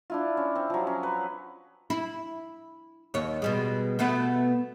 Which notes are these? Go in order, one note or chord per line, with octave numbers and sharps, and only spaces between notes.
D4 E4 F4
C#4
C4
F3 F#3
C#4
B4
E4
D#2 C#5
B2 G3 G#3
B2 A3 B3